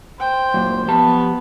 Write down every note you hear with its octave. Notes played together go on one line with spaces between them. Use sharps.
C5 G5
F#2 A#2
F3 B3 G4 A5